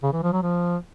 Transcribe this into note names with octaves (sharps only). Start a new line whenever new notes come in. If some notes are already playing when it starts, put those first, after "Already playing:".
C#3
E3
F3
F#3
F3